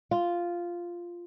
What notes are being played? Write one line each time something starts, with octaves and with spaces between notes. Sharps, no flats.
F4